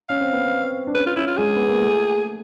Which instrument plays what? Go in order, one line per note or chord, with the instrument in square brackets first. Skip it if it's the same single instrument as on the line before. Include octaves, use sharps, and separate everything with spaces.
[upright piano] C#4 [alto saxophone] F5
[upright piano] C4
B3
C4
D4
[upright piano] C#4 [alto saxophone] B4
[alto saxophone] F4
[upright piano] C#4 [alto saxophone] E4
[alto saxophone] F4
[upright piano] G#3 [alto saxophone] G#4
[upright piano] B3
A#3
A3